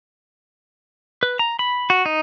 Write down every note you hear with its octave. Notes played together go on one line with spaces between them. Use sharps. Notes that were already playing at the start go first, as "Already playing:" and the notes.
B4
A#5
B5
F#4
D#4